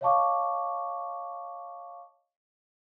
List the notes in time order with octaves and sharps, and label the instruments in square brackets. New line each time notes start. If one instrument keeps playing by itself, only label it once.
[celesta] C#5 D#5 F5 A5 C#6 D6